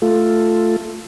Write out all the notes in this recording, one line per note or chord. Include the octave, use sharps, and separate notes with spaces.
A3 F4 A4